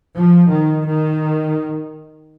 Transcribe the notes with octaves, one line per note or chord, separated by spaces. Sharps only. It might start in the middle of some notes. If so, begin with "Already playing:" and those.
F3
D#3
D#3